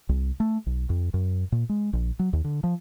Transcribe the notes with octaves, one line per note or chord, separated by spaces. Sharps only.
C2
A3
B1
F2
F#2
A#2
G#3
A#1
F#3
D#2
D3
F3